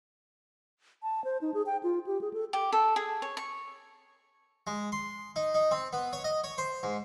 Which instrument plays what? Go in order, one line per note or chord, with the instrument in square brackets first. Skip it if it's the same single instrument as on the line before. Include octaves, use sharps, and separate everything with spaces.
[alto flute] A5
C5
D#4
G#4
G5
F4
G4
G#4
A4
[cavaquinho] G4
A4
G#4
C#5
C#6
[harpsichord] G#3
C6
D#4
D#4
C4
B3
C#5
D#5
C#5
C5
G#2